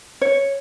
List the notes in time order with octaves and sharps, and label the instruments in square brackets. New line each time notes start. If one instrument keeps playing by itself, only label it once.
[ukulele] C#5